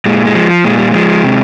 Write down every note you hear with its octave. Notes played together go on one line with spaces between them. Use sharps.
A#2 G#3
G#3
F3
A#2 G#3
G3
F3 G#3
C3